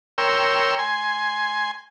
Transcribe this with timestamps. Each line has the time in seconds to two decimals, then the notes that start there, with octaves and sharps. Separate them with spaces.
0.18 A#4 C#5 G5 C6 E6
0.79 G#5 C6